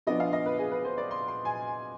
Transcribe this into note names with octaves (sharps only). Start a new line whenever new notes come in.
F3 B3 D4 D#5
F5
D#5
B4
G#4
B4
C5
D5
C6
C6
G#5